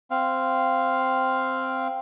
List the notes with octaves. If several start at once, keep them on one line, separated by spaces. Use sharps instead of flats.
C4 F5